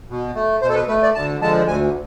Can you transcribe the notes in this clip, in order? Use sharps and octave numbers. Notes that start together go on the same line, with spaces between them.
B2
A3
B2 C5
A4
B4
A3 B4
D5
D2 A5
D3 F3 G#3 A5
D2 G#5